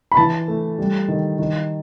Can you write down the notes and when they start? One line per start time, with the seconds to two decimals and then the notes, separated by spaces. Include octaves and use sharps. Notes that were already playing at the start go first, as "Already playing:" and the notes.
0.12 B5
0.17 E3 A5
0.48 A3
0.78 G3
1.08 D#3
1.39 D#3